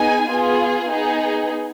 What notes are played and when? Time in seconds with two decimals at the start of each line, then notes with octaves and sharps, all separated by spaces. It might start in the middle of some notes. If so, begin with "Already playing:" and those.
Already playing: B3 D#4 G#4 G#5
0.29 B3 F4 G#4
0.89 B3 D#4 G#4